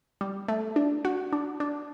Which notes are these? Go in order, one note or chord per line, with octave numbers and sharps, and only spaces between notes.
G3
A3
D4
F#4
D4
D4